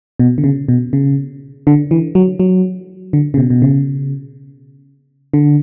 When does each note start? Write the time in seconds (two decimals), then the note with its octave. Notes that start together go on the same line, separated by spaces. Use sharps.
0.20 B2
0.38 D3
0.44 C#3
0.69 B2
0.93 C#3
1.67 D3
1.91 E3
2.15 F#3
2.40 F#3
3.13 D3
3.34 C#3
3.37 B2
3.50 B2
3.62 C#3
5.34 D3